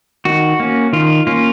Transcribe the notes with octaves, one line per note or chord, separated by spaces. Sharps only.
D#3 F#4
A#3 C#4
D#3 F4
A#3 C#4 F4